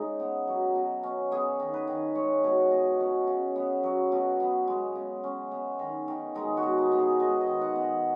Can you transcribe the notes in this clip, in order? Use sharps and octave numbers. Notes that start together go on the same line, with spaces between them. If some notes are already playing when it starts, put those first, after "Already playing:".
Already playing: C#3 G#3 D#4
B3
F#3
B2
C#4
B3 G#4
D#3
B4
D#3
G#3 C#5
B2 C#5
B3 D#5
F#3 C#4
C#3
B3
F#3
B2
B3
G#3
C#3
C#4
B3
D#3
D#3
G#3 D#4
F#4
B2
D#4
B3
G#4
G#3 D#5
D#5
D#3
F#5
B3
D#5